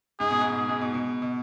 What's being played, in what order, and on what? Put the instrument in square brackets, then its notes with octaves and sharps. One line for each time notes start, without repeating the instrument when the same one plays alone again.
[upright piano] G#2 [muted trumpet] G#4
[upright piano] B2
G#2
[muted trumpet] G#4
[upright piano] G#2
B2
B2
B2